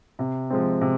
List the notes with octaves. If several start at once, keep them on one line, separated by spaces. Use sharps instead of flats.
C3
F3 G#3 C4
C3